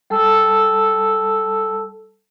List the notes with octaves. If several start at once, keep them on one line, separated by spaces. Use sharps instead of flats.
G3 A4 A5 E6